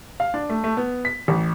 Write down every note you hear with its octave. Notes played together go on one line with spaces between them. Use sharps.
F5
D4
A3
A3
B3
B6
A1